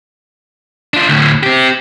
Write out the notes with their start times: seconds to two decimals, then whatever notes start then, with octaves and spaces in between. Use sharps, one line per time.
0.94 D4 F4
1.09 D2 A2
1.43 C4 G4